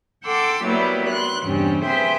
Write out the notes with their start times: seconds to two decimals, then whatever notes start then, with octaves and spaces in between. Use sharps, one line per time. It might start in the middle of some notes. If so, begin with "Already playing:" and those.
0.25 A4 F#5 G5 C6 D6 E6
0.64 F#3 G3 A#3 B3 E4 G4
1.11 C6 F#6
1.44 E2 G2 C#3 G3 C4 C#4
1.85 G#4 B4 C5 E5 G5 C6